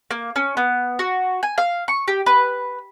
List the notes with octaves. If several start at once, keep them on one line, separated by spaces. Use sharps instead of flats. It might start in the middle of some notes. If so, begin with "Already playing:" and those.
A#3
C#4
B3
F#4
G#5
F5
C#6
G4
B4